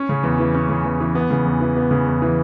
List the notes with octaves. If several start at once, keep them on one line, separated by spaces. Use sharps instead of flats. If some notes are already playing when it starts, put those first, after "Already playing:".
Already playing: C#4
C#3
E2
E3
C#4
C#3
E2
E3
B3
C#3
E2
E3
B3
C#3
E2
E3